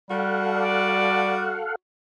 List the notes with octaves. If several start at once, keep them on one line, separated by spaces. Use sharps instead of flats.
G3 F#4 A4 F5 F#5
D5